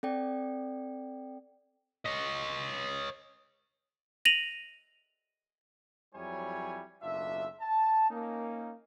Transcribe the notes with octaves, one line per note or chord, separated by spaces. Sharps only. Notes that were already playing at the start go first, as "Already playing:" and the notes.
C4 A4 D5 G5
C#5 D#5
A#6 D#7 F7 F#7
F2 F#3 G3 E4 C#5 G#5
F#1 B1 D4 F4 E5
A5
A#3 C#4 D#4